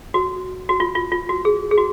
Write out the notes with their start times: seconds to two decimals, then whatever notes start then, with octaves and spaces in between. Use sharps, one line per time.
0.14 F#4
0.69 F#4
0.80 F4
0.95 F4
1.12 F4
1.29 F#4
1.45 G#4
1.71 G#4
1.78 F#4